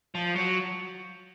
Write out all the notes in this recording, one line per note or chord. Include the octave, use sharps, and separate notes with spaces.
F3
F#3